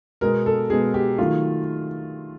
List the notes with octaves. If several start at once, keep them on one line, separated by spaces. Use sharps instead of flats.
B2 G#3 B3 A#4
A4
B2 G#3 B3 G#4
G4
D#3 F#3 A3 F4